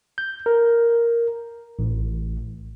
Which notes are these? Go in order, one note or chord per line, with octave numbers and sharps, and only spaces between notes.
G6
A#4
A1